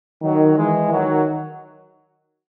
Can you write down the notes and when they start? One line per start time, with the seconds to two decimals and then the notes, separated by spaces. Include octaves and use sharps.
0.22 D#3 F#3
0.56 E3 G#3
0.90 D#3 F#3